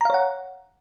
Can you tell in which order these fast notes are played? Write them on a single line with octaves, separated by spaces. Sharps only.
A#5 F5 C#5 F#5